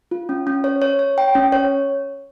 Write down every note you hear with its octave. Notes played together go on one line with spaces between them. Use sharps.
F4
C#4
C#4
C#5
C#5
C#5
G5
C#4
C#5